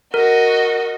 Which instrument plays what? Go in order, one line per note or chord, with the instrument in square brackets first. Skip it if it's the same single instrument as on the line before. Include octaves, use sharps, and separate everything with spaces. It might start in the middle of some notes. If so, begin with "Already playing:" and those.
[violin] F#4 D#5 [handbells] A#4